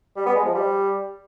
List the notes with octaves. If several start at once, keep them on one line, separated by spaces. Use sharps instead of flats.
G3
B3
G#3
F3
G3